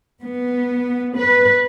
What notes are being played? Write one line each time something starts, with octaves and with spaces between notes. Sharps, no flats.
B3
B4